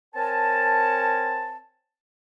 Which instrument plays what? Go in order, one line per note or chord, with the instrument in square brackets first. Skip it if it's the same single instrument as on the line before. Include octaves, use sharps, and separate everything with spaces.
[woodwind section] C4 A#4 C#5 G#5 A5